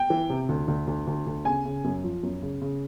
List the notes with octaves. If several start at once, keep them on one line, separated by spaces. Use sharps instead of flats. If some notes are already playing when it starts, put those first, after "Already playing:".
Already playing: G5
E3
C3
D2
D2
D2
D2
D2
C#3 G#5
C#3
F#2
F3
F#2
C#3
C#3